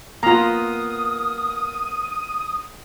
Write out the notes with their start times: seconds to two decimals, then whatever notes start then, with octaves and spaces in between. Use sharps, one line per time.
0.23 A#3 B3 F4 A#5 D#6